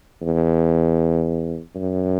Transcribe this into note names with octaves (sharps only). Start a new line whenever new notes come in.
E2
F#2